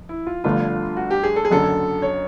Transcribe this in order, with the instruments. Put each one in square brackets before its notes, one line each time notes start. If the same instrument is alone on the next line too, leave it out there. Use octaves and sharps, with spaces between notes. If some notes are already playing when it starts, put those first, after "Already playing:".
Already playing: [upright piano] F2
[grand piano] E4
F4
[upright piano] G1 G2 D3 F3 A3 [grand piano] F4
[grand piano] F#4
G4
G#4
A4
G#4
[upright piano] F#1 F#2 D3 [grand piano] A4
[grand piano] C#5